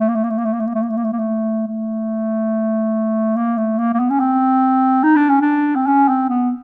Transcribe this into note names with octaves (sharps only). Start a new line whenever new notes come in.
A3
A#3
A3
A#3
A3
A#3
A3
A#3
A3
A#3
A3
A#3
A3
A#3
A3
A#3
A3
A3
A#3
A3
A#3
A#3
B3
C#4
C4
D#4
D4
C#4
D4
C4
C#4
C4
B3